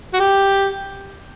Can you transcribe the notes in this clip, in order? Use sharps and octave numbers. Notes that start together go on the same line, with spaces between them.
F#4
G4